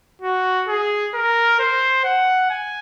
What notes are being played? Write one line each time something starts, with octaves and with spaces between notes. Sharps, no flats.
F#4
G#4
A#4
C5
F#5
G#5